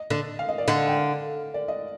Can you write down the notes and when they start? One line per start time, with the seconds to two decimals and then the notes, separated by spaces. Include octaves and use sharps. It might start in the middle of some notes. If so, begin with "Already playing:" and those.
Already playing: D#5
0.10 D3
0.39 F5
0.49 D#5
0.58 D5
0.67 D3 D#5
0.87 G5
0.97 F5
1.54 D5
1.68 D#5